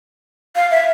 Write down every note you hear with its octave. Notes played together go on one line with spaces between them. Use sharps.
F5
E5